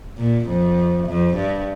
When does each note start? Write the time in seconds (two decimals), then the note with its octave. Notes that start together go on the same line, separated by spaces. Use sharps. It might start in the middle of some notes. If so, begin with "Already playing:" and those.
0.18 A#2
0.47 F2
1.06 F2
1.35 G2